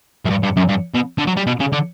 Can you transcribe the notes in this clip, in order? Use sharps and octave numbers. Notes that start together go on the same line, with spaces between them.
F#2
G2
G2
F#2
G2
B2
D3
F#3
G3
B2
C#3
D3